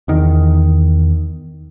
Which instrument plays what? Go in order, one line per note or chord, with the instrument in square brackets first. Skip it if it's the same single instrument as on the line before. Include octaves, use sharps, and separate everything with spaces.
[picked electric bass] E2 D#3